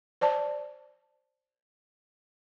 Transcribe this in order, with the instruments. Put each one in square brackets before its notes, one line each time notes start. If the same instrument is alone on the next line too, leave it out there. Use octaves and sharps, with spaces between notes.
[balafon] C5 D5 A5